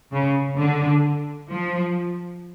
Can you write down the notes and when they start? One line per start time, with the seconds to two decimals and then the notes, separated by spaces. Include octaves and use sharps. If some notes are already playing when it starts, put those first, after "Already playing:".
0.12 C#3
0.59 D3
1.51 F3